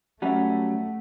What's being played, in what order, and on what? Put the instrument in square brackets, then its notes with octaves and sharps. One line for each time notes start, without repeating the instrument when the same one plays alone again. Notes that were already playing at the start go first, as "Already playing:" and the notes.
[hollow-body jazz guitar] F#3 G3 C#4 [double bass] A3 [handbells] E5 F#5